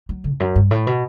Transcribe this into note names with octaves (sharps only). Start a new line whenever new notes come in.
F#3
D3
E2
F#2
G2
A2
B2